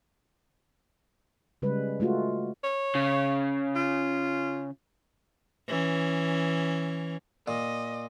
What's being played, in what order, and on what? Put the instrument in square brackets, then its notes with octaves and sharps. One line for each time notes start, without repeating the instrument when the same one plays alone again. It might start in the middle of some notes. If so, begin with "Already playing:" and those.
[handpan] C#3 G3 G#3 B4
G#3 A3 F4 F#4
[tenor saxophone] C#5
[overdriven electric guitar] C#3
[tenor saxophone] F4
[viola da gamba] E3 C#4
[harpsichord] A#2 [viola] D#5